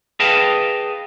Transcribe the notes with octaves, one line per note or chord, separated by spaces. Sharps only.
G#4 B4 D#5 F5 G5 A5